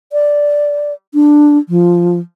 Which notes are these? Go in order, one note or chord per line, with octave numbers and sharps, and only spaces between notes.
D5
D4
F3